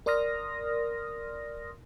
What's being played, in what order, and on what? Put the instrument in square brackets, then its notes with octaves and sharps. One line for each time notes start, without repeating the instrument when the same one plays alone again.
[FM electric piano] A#4 D5 C6 D#6 F6 A#6